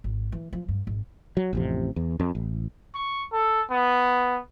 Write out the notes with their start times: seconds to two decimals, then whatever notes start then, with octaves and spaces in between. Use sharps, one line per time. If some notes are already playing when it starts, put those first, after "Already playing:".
0.04 G#1
0.32 E3
0.53 F3
0.68 G2
0.87 G#1
1.37 F#3
1.53 A1 F2 C3
1.96 E2
2.20 F2
2.35 A1
2.94 C#6
3.33 A4
3.71 B3